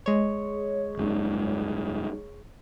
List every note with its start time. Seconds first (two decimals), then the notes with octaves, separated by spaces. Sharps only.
0.06 G#3 C#5
0.97 F#1 C#2 G#2